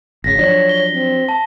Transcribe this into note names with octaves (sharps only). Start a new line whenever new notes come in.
G#1 C#3 A#6 B6
F3 F#3 D4 C#5
G7
C4
A5